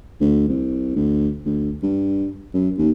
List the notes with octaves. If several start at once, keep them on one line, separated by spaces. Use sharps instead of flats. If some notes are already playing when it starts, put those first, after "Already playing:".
D2
C2
D2
D2
G2
F#2
D#2